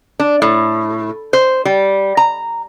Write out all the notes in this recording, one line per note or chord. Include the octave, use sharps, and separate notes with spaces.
D4
A2
C5
G3
A#5